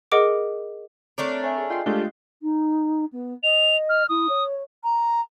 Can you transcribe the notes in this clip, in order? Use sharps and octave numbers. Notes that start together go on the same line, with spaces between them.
G#4 A#4 D#5 F#5 D6 D7
A3 C4 D4 A#4 C#5 D6
C#5 E5 G#5
G#4
F4 D#5 G5 C6 C7
G#3 A3 D4 F4 G4 G6
D#4
B3
D#5 F7
F6
E4 D#6
C#5
A#5